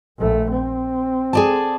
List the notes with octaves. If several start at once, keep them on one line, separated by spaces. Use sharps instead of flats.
A#1 A3
C4
G#4 D5 A5